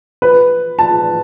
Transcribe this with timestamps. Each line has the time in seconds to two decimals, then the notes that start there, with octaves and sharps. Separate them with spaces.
0.22 B4
0.79 A5